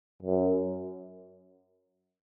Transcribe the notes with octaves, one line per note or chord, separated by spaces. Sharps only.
F#2